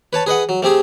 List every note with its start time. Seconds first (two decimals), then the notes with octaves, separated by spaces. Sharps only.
0.13 B4 C#5 A5
0.26 G#4 B4 D#5 F#5
0.49 F#3
0.63 A3 C4 G4 G#4